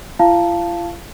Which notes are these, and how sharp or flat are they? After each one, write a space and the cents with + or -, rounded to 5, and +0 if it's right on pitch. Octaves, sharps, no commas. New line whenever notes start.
F4 -45 F5 -10 A5 +0